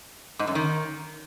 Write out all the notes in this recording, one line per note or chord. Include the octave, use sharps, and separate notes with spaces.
G#2
F#2
D#3